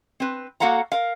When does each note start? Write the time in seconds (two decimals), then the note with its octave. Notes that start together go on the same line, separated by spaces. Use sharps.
0.20 C4 B4
0.60 A#3 F#4 A4 F5 F#5 A#5
0.92 A#4 F5